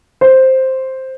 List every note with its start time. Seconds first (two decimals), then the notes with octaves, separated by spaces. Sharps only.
0.21 C5